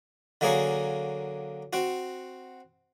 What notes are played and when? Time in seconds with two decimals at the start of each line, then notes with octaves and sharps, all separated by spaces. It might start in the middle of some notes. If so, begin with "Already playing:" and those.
0.41 D3 F#3 A#3 G#4 C#5
1.73 C4 F#4